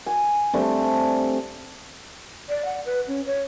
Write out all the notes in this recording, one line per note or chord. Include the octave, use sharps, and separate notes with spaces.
G#5
G3 A3 C4 D4
D5
F#5
B4
C#4
C#5